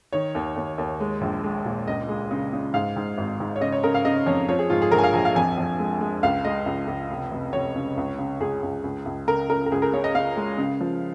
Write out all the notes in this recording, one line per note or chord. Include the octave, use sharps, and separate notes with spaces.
D#3 C#5
D#2
D#2
D#2
G#3
A#1
G#3
A#2
C#2 D#5
G#3
C#3
C#3
G#2 F5
G#2
G#1
G#2
C#5
C#3 D#5
C#5
C#3 A#4
F5
C#3 D#5
F2 C#5
F3 C#5
G#4
G#2 F4
G#4
A#1 A#4
G#5
F5
A#1 G#5
F5
F2 G#5
F2
G#3
G#3
C#2 F5
G#3 D#5
C#2
C#2
F1
F1
F1 C#5
C#3
C#2
C#3
C#2 G#4
C#2
C#2
C#2
C#3 A#4
C#3 A#4
A#4
C#2 G#4
A#4
C#3 C#5
D#5
C#3 F5
G#3
C#3
F3